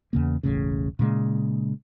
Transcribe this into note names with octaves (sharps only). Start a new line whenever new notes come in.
E2 C#3 A#3
E1 A1 A2 C#3
A#2 C#3 G#3